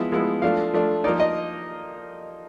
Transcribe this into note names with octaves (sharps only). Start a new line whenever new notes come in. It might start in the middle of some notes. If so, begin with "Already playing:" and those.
Already playing: F3 G#3 B3 E4 E5
F3 G#3 B3 E4
F3 A3 D4 F5
F3 A3 D4
F3 A#3 D#4 D5
D#5